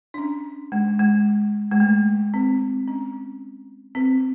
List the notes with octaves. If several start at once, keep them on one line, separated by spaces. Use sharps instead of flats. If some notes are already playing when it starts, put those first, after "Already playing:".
D4
C#4
G#3
G#3
G#3
A3
C4
C#4
C4